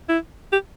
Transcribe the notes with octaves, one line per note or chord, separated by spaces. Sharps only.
E4
G4